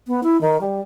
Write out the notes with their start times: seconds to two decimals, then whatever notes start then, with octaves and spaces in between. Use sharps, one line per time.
0.07 B3
0.23 E4
0.41 D#3
0.61 G3